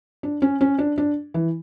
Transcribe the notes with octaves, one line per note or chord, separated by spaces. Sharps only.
D4
C#4
C#4
D4
D4
E3